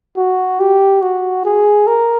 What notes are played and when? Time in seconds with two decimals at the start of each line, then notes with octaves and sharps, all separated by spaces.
0.17 F#4
0.60 G4
1.02 F#4
1.45 G#4
1.87 A#4